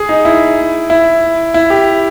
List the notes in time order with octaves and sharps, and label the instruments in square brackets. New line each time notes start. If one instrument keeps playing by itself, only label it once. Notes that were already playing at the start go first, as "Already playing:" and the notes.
Already playing: [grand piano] G#4
D#4
E4
E4
E4
G4